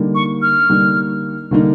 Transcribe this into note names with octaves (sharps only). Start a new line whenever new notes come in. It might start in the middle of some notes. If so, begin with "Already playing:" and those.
Already playing: D3 G3 A#3 D#4
C#6
F6
D3 G3 A#3 D#4
D3 G3 A#3 D#4